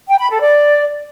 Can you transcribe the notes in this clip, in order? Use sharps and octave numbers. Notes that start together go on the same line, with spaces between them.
G5
B5
A4
D5